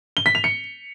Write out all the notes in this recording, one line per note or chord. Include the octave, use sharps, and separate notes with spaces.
G7
B6
F7
C#7